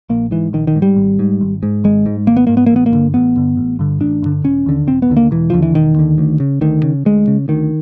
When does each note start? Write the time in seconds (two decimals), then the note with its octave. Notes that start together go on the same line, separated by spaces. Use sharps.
0.09 A#1 A#3
0.31 G#2 E3
0.53 A#1 D#3
0.67 D#3
0.75 G#2
0.82 G3
0.96 G#1
1.19 G#2
1.41 G#1
1.63 G#2
1.84 G#1 G#3
2.06 G#2
2.27 G#1 A#3
2.37 B3
2.47 G#2 A#3
2.57 B3
2.66 A1 A#3
2.76 B3
2.86 A#3
2.92 G2 D3
3.14 A1 B3
3.37 G2 D3
3.57 A1
3.79 G2 D3
4.00 A1 D4
4.23 G2 D3
4.44 E1 C#4
4.66 D#2 D3
4.87 E1 C4
5.02 B3
5.10 D#2 D3
5.17 A#3
5.31 E1 E3
5.50 D#2 D3 F3
5.62 E3
5.74 E1 D#3
5.96 D#2 D3
6.18 D2
6.40 C#3
6.61 D2 D#3
6.83 C#3
7.05 D2 G#3
7.28 C#3
7.48 D2 D#3